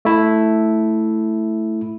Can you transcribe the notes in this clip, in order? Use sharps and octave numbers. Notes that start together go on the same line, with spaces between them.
A3 E4